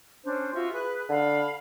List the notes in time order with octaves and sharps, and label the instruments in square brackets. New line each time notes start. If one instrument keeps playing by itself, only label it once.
[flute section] C#4 D4 C5
F4 F#4 E5
G#4 B4 F#6
[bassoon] D3 [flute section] F5 B5